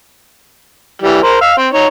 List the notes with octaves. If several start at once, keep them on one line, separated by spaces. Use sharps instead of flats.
E3 G3
A#4 C5
F5 E6
C4
D#4 C#5